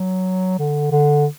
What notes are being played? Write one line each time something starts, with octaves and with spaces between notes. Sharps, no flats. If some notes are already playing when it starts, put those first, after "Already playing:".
Already playing: F#3
D3
D3